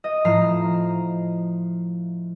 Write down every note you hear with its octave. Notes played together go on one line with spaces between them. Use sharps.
D#5
A2 F3 A#5 C7